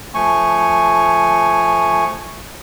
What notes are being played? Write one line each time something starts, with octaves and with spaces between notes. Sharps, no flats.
F3 A3 G#5 C#6